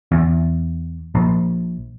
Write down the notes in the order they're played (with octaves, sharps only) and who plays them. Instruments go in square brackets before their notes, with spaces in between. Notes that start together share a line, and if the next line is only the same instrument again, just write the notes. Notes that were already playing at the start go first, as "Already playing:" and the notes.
[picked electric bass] E2
A#1